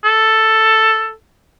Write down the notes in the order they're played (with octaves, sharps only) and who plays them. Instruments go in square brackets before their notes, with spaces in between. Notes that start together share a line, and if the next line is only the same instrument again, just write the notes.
[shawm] A4